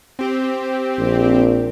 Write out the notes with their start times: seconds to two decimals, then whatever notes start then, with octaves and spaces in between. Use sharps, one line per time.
0.19 C4 G4
0.98 A#1